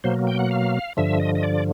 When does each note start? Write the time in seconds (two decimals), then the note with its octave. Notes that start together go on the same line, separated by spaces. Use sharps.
0.04 B2 F#3 A#3 C5
0.27 G5
0.39 F#5
0.51 F5
0.97 G2 D3 F3 E5
1.20 D#5
1.35 D#5
1.43 D5